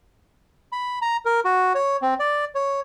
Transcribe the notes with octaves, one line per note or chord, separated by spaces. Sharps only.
B5
A#5
A#4
F#4
C#5
C4
D5
C#5